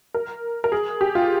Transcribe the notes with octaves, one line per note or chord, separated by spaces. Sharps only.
A#4
A#4
G#4
G4
F4